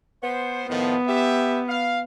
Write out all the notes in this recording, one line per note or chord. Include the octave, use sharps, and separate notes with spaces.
B3 C5
A2 D#3 F3 B3
G4 E5
F5